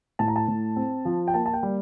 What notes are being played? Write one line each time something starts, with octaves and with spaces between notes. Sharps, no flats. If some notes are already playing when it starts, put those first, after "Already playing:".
A2 A5
A#5
A5
A2
C4
F3
G5
A#3 A5
A5
G5
G3